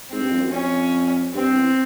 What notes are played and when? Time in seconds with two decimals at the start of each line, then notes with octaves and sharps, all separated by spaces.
0.10 G#2 C4
0.21 G2
0.30 F2
0.41 F#2
0.51 F2 C#4
1.34 G2 C4
1.55 E2